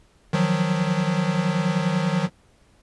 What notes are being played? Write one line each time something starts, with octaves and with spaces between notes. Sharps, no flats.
D#3 F3 F#3